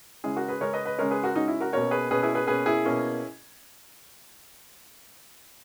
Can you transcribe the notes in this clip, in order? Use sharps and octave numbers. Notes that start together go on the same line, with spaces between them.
C#3 G#3 C#4 E4 G#4
F#4 A#4
G#4 B4
C#3 G#3 C#4 A#4 C#5
B4 D#5
B4 D#5
C#3 G#3 C#4 A#4 C#5
G#4 B4
F#4 A#4
C#3 G#3 C#4 D#4 F#4
E4
F#4 A#4
B2 A#3 C#4 A#4 C#5
G#4 B4
B2 A#3 C#4 G#4 B4
E4 G#4
G#4 B4
B2 A#3 C#4 G#4 B4
E4 G#4
B2 A#3 C#4